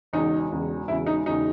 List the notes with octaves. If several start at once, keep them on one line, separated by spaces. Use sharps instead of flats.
E1 E2 C#3 D#4
E1 E2 C#3
E1 E2 C#3 E4
D#4
E1 E2 C#3 D#4